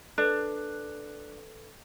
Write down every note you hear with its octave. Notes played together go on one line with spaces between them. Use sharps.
D4 A4 B4 F#6